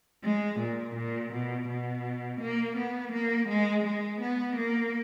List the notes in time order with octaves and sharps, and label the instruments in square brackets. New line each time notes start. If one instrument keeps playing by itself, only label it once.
[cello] G#3
A#2
A#2
B2
B2
A#3
B3
A#3
G#3
G#3
B3
A#3